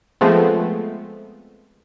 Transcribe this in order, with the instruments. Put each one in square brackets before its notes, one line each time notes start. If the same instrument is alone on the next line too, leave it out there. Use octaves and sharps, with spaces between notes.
[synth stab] F3 G#3 A3 B3 C4